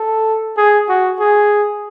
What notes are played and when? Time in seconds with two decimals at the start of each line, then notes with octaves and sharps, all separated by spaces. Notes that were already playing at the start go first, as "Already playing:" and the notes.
Already playing: A4
0.57 G#4
0.89 F#4
1.20 G#4